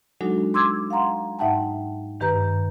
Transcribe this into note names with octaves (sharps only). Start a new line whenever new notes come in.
F#3 G#3 D4 D#4 F#4 A4
C6 D6 E6 G#6
F5 F#5 A#5 C6
G#2 D#4 E5 F#5 G5 A5
G2 D#3 G4 B4 A#5 G6